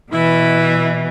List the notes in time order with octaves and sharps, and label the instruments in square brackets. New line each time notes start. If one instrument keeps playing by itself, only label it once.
[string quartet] B2 E3 [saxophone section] E4